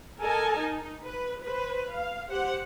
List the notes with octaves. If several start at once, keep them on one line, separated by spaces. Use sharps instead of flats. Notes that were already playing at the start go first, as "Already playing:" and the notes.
A4 A#4 D#5 G#5 A5
D#4
B4
B4 C5
F5
G4 C5 F#5